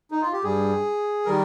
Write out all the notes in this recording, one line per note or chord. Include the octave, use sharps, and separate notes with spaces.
D#4
F4
G4
G2 G3 G#4
D#3 G3 A#4